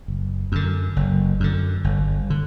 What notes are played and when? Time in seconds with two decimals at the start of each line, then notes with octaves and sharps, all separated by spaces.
0.08 F#1
0.52 F#2 D3
0.96 F#1
1.40 F#2 D3
1.84 G1
2.30 D3